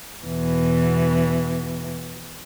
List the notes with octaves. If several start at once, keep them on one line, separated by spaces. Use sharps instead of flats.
E2 B2 E3